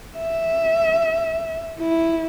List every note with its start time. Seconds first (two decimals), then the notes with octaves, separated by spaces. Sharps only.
0.17 E5
1.80 E4